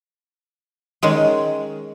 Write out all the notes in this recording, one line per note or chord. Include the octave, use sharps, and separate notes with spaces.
D#3 G#3 C#4 G#4